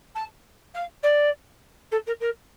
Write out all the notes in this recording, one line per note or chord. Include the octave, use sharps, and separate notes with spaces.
A5
F5
D5
A4
A#4
A#4